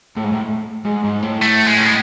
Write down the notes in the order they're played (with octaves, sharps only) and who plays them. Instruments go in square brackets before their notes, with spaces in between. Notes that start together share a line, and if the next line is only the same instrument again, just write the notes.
[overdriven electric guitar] A2
G#2
A2
G#2
G#2
A2
[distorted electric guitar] A3
G#3
C#4
B3